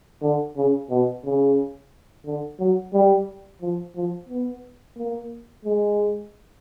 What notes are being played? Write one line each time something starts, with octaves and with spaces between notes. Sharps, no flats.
D3
C#3
B2
C#3
D3
F#3
G3
F3
F3
B3
A#3
G#3